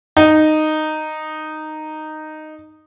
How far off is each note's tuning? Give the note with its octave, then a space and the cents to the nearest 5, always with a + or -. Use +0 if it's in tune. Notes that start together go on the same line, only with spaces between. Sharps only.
D#4 -10